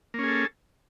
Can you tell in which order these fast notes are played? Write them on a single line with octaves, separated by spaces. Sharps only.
A#3 C#4 G#4 A4